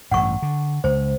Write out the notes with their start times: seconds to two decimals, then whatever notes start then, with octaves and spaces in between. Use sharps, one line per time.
0.11 A1 G2 F#5 C#6
0.42 D3
0.84 C#2 C5